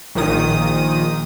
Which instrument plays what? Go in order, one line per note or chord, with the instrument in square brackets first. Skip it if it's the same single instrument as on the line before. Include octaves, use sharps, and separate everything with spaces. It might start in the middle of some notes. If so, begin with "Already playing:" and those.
[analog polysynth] A#1 A#2 D#3 D#6